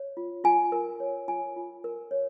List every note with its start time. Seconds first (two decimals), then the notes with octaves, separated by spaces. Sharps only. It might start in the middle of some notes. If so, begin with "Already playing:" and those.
Already playing: C#5
0.17 F4
0.44 F4 G#5
0.72 A#4
1.00 C#5
1.28 F4 G#5
1.56 F4
1.84 A#4
2.11 C#5